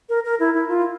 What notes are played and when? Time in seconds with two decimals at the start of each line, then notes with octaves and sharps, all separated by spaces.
0.09 A#4
0.25 A#4
0.40 E4
0.54 E4
0.69 F4